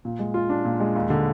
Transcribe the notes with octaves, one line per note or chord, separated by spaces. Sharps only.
A#2
G#3
F4
D4
A#2
G#3
D#2
D3